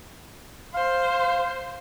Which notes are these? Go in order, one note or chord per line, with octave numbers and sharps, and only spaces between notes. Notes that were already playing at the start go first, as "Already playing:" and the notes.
C5 F5